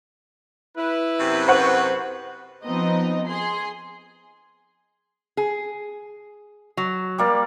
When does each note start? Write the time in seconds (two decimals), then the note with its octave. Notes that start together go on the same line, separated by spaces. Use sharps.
0.77 E4 B4
1.18 F#2 C3
1.48 B4 C5 F#5 C#6
2.65 F3 B3 C4 D#4 D#5
3.27 G#4 C6
5.37 G#4
6.77 F#3
7.18 G3 A#3 D5